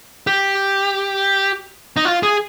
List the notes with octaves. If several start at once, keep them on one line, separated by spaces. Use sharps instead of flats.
G4
D#4
F4
G#4